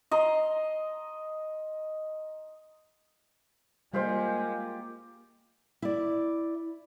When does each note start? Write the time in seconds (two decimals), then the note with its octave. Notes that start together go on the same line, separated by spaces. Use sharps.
0.11 D#5 A#5 C6
3.94 G3 G#3 A#3 F4 G4 C5 F5
5.82 E4 D5